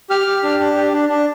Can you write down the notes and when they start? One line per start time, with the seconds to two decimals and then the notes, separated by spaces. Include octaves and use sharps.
0.10 G4 F6
0.27 G4
0.43 D4
0.60 D4
0.77 G4
0.92 D4
1.09 D4